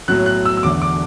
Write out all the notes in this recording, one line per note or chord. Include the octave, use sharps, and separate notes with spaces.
B1 A2 F#3 F#6
F#6
E6
E6
E1 E2 D3 A3 D6
D6